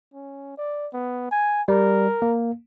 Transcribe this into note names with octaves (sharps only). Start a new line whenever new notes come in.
C#4
D5
B3
G#5
G3 A#4
A#3